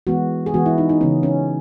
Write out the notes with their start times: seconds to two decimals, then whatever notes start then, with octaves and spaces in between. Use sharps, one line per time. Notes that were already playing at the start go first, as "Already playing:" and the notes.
0.07 E3 G#3 B3 F#4
0.46 G#4
0.54 E3 G#3 B3 F#4
0.66 E4
0.78 D#4
0.89 D#4
1.01 C#3 E3 B3 C#4
1.23 C#4